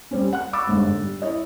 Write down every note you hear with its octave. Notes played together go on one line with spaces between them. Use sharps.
G3 C4 C#4
F#5 F#6
B5 C#6 D6 E6 A6
G1 G#2 G3
G3
E4 C#5 D#5